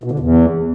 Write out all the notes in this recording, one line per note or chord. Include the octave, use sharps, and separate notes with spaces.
B2
D3
E2